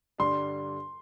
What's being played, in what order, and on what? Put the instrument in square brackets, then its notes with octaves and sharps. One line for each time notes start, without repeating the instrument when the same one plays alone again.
[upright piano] G2 D3 G3 D4 [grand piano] C6